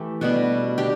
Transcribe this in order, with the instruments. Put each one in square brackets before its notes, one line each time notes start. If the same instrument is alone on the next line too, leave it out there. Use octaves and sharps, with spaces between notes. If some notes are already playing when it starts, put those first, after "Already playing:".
Already playing: [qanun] E3 A3 G4 A4
B2 G3 B3 D4 F#4
D4 G4